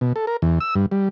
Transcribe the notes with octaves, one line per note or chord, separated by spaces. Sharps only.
B2
A4
A#4
E2
E6
G2
G3